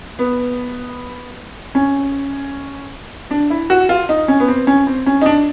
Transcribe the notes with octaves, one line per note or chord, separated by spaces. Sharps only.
B3
C#4
D4
E4
F#4
F4
D#4
C#4
B3
C4
C#4
C4
C#4
D#4
D4